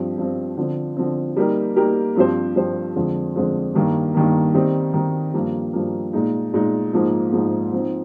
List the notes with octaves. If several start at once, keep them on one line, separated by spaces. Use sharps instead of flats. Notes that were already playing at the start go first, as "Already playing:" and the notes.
Already playing: G2 F3 C4
G2 F3 C4
D3 F3 C4
D3 F3 C4
G3 A#3 D#4 G4 A#4
G3 A#3 D#4 G4 A#4
G2 F3 C4 G4 C5
G2 F3 C4 G4 C5
F2 D3 G#3 C4 F4
F2 D3 G#3 C4 F4
G2 D#3 A#3
G2 D#3 A#3
D#3 G3 C4 D#4
D#3 G3 C4 D#4
G2 F3 A#3
G2 F3 A#3
A#2 G#3 D#4
A#2 G#3 D#4
G#2 F3 A#3 D#4
G#2 F3 A#3 D#4
F3 C4 D#4